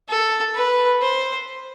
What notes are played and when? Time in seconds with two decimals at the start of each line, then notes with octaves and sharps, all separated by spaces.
0.09 A4
0.55 B4
1.02 C5